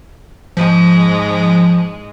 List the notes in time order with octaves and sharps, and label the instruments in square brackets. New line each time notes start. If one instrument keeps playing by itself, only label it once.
[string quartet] G#2 G#3 [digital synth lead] F3